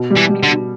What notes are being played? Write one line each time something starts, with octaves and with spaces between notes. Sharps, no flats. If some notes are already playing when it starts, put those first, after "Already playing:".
Already playing: B2
G3
E3
G3
D3
B2